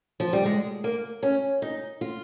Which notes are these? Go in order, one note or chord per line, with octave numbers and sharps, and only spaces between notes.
F3
G3
G#3
A#3
C#4
D#4
F4